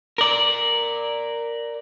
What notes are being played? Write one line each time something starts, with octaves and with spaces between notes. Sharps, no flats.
A#4 D5